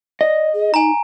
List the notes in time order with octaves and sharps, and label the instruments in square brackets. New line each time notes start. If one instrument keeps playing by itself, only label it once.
[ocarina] D5 [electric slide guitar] D#5
[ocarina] G#4
[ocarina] D#4 [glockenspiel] G#5 A#5